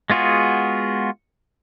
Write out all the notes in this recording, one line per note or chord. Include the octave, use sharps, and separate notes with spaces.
G#3 B3 F4 F#4 G#4